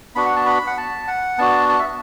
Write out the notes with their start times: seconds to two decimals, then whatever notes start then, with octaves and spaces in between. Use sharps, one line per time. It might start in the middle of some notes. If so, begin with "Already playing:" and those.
0.16 B3 D4 F#4 B5
0.25 F#5
0.36 A5
0.46 B5
0.67 F#5
0.77 A5
1.07 F#5
1.38 B3 D4 F#4 A5
1.69 A5
1.79 E5